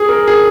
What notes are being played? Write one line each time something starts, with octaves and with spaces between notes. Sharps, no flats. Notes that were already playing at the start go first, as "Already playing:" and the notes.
Already playing: G#4
A#4
G#4